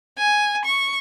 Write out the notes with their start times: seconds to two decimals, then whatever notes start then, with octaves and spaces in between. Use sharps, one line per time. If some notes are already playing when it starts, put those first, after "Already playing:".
0.18 G#5
0.65 C#6